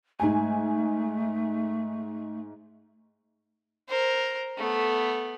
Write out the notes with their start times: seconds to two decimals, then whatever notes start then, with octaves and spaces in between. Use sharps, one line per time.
0.20 G#2 A3 G#5
3.88 A#4 C5
4.57 A3 B3